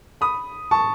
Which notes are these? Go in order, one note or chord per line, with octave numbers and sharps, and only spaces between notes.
B5 D#6
A5 C#6